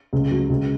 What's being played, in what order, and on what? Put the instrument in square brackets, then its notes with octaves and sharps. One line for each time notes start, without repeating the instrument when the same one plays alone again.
[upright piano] C#2
F#3
C#2